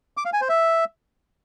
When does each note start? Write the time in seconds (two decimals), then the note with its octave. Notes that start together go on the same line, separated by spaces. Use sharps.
0.17 D6
0.25 F5
0.33 G#5
0.41 C5
0.49 E5